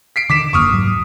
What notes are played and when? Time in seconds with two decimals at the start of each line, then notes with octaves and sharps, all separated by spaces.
0.16 B6 C7 D7
0.30 D3 D#3 D6 B6 E7
0.53 F#1 E2 A#3 C#6 D#6 F6
0.71 C2 G#2 F#3